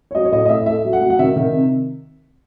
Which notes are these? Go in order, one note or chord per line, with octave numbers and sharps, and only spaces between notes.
C#5
F#3 D#5
C#5
A2 D#5
D#5
A2 E5
A3 E5
F#3
F#5
F#3
F#5
D#3 E5
D#3
C3